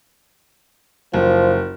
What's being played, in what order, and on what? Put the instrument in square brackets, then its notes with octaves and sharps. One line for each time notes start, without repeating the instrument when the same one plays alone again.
[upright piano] F#1 [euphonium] F3